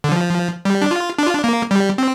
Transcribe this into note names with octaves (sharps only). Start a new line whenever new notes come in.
D3
F3
G3
D4
F4
D4
F4
D4
A#3
G3
C4